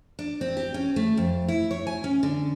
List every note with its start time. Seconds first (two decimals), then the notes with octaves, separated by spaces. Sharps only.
0.19 D4
0.41 C4
0.57 G4
0.74 C#4
0.96 A3
1.17 F2
1.48 E4
1.71 C#5
1.87 G#5
2.04 C#4
2.23 D3